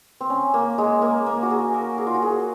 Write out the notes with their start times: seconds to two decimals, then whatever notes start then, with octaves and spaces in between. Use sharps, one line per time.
0.21 C4
0.30 C#4
0.54 A#3
0.78 G#3
1.02 A#3
1.26 A#3
1.43 F#4
1.50 G#4
1.74 A#4
1.98 G#4
2.07 F4
2.14 F#4
2.22 G#4